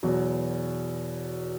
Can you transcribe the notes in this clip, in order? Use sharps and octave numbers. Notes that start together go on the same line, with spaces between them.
E2 B2 F#3